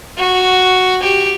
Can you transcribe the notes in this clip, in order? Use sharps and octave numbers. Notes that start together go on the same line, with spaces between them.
F#4
G4